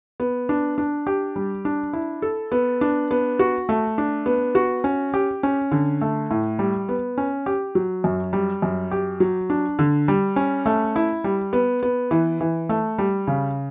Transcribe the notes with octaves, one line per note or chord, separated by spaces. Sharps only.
B3
D4
D4
G4
G3
D4
E4
A4
B3
D4
B3
F#4
A3
D4
B3
F#4
C#4
G4
C#4
D3
A3
A2
G3
B3
C#4
G4
F#3
F#2
G3
F#2
G4
F#3
D4
D3
G3
C#4
A3
E4
G3
B3
B3
E3
E3
A3
G3
C#3